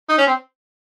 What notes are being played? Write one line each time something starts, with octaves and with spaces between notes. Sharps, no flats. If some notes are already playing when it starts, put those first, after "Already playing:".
D#4
C#4
C4